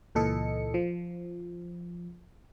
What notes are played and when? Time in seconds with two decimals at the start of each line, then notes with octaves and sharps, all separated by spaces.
0.15 C#2 A#2 E3 A4 D#5 C#7
0.74 F3